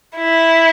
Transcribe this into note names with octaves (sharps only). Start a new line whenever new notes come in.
E4